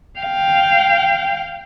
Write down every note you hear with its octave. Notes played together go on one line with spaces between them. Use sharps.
F5 G5